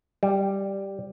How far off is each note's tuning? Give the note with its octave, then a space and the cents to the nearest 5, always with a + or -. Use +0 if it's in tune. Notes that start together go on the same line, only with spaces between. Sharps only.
G3 +0